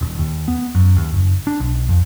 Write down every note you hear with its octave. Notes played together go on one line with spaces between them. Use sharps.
D#1
D#2
B3
F#2
D#2
F#1
D4
B1
F2